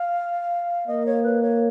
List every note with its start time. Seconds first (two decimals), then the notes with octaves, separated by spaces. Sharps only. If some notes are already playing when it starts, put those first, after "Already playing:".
Already playing: F5
0.87 A#3 D#5
1.06 C#5
1.23 B4
1.41 C#5